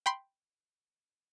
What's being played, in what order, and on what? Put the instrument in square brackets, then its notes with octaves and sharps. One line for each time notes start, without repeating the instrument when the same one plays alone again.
[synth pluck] G5 B5 C6